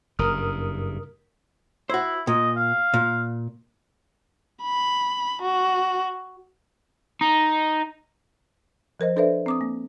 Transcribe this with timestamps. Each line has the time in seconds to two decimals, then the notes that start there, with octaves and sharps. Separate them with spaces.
0.19 F#1 G2 A#4 D#6 F6
1.90 E4 F#4 C5
2.27 A#2 D#5
2.57 F5
2.94 A#2
4.63 B5
5.42 F#4
7.21 D#4
9.00 F3 A#4 C5 D#5
9.16 D4 A4 B4 C5 D5 E5
9.46 C4 D6 D#6
9.61 A#3